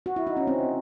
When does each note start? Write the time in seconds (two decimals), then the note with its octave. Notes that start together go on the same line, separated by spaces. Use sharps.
0.06 F#4
0.16 E4
0.27 D#4
0.37 C#4
0.47 C4